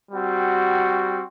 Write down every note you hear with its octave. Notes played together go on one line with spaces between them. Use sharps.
G3 C4 F#4